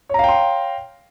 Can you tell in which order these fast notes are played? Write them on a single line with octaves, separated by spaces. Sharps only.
C#5 A#5 F5 G5 C6